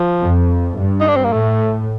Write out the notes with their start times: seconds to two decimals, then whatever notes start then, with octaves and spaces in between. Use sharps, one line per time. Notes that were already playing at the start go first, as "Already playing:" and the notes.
Already playing: F3
0.21 F2
0.76 G2
1.00 D#4
1.08 D4
1.16 C4
1.25 A#3
1.32 A2 A3